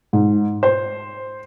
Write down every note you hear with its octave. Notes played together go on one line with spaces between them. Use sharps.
G#2
C5